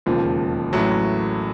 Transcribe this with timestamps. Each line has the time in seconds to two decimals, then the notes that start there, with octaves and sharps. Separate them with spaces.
0.06 E1 D#2 C#3 F3
0.73 A1 A2 F#3